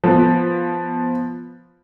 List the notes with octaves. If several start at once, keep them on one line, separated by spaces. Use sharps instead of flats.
F3 B3